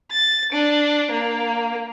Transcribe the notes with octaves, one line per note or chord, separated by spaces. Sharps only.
A6
D4
A#3